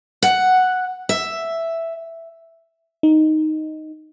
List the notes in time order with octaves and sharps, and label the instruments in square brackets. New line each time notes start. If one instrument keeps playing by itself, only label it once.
[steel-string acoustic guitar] F#5
E5
[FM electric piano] D#4